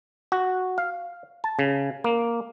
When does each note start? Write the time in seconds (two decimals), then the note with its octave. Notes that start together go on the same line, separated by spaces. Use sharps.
0.32 F#4
0.78 F5
1.44 A5
1.59 C#3
2.04 A#3